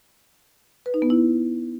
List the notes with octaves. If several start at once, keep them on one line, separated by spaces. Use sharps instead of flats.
B4
D#4
B3
E4